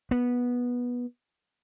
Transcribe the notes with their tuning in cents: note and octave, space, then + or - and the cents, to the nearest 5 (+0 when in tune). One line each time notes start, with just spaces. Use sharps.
B3 -15